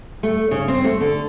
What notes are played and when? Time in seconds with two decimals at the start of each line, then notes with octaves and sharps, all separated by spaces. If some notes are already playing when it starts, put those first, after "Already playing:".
0.23 A3
0.51 C#3
0.68 C4
0.84 A3
1.00 D3